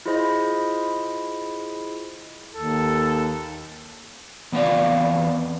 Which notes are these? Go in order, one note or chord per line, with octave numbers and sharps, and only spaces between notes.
E4 F4 G#4 C5 D#5 B5
D#2 A4
E2 B3 C4 D5 F5